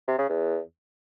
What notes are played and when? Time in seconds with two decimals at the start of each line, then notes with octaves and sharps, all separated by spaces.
0.08 C3
0.18 C#3
0.29 E2